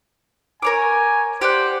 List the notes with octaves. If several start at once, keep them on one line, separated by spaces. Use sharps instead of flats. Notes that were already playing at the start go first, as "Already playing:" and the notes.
A#4 C#5 G#5 D6
G4 C5 D5 F#5